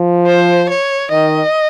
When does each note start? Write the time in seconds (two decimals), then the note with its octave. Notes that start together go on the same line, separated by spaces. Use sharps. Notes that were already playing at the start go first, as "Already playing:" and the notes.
Already playing: F3
0.26 C5
0.69 C#5
1.11 D#3 D#5